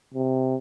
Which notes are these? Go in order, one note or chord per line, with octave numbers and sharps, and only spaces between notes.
C3